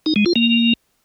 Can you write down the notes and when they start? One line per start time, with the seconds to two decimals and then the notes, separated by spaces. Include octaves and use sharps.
0.06 D#4
0.16 G#3
0.26 F4
0.36 A#3